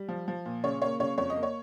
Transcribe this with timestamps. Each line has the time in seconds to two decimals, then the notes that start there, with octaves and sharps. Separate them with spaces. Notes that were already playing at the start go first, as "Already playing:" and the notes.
Already playing: G3
0.09 F3
0.28 F3
0.45 A#2
0.63 C#3 C#5
0.82 A#3 C#5
1.00 C#3 C#5
1.18 F2 C#5
1.30 D#5
1.36 A#3
1.43 C#5